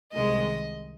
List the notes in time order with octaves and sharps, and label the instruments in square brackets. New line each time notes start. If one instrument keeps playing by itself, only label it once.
[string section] C2 C3 D#3 G#3 [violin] D#5